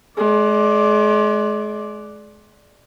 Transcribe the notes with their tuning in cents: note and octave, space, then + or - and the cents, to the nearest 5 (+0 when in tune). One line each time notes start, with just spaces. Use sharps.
G#3 +35 D5 +0